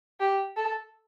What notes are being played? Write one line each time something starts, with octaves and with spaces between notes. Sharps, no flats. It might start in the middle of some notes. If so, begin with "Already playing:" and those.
G4
A4